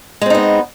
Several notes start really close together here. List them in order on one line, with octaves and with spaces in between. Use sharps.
G#3 C4 D#4 B3